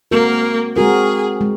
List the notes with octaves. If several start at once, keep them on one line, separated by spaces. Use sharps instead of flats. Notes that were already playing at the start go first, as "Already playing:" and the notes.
G#3 A#3 C4 F#4 A#4
G#3 C4 F#4 G#4 A#4
G#3